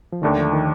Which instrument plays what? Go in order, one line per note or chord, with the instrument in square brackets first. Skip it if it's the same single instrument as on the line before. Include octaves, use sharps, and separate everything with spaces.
[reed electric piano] F3
[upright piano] D#2 D3 A3 [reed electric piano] D#3
[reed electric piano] F3
D#3